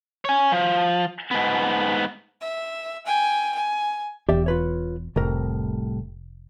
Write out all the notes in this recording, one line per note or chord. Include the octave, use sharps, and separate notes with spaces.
C#5 G#5
F3
G#2 B3
E5
G5 G#5
G#5
E1 E2 G4 D5 E5
F4 B4 C#5
F1 C2 A2 A#4